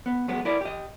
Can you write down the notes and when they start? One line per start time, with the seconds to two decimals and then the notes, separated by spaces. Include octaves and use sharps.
0.06 B3
0.28 F#3 G#3 B3
0.45 E4 A#4 D5
0.61 G4 D#5